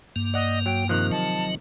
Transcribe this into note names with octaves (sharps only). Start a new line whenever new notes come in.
G2 A#3
D5 D#5 F#5
F#3 G5
C3 D#3 F3 F#6
F#3 D#5 A5